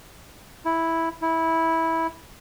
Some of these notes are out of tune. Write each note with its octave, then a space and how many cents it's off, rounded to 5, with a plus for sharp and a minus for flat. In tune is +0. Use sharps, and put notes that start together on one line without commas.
E4 -5
E4 -15